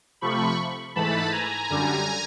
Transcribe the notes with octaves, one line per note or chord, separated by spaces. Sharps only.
C3 F3 A3 B5 C#6
G#2 E3 A3 A5 B5
G#5 A#5
F#2 D3 G3